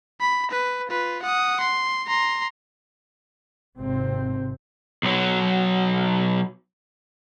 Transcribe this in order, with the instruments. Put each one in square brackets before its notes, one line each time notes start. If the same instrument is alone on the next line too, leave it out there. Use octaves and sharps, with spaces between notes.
[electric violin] B5
B4
F4 B4
F#5 D#6
C6
A#5 C6
[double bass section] G#1 C3 C4
[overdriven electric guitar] B1 F#3